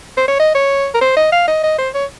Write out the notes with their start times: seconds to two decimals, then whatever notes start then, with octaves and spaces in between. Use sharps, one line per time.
0.17 C5
0.28 C#5
0.39 D#5
0.55 C#5
0.94 A#4
1.01 C5
1.16 D#5
1.32 F5
1.48 D#5
1.63 D#5
1.78 C5
1.94 C#5